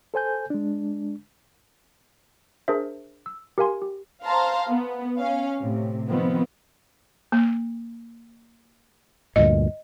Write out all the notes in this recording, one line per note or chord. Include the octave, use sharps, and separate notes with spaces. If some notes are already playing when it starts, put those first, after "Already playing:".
A4 C5 G#5 G6
G#3 D4
D4 G#4 A#4 C5 E5
E6
G4 A#4 F5 G#5 C6
G4
C5 F5 A5 A#5 C6
B3
C#4 F5
A2 C3
D#3 F3 B3 C4
A#3
D2 G2 A#2 D#5